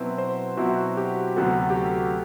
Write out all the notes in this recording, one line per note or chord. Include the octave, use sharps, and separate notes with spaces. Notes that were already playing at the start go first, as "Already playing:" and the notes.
Already playing: B2 F#3 C4 E4 B4
C5
B2 F#3 C4 E4 F#4
G4
D2 C3 F#3 B3 A4
G4
F#4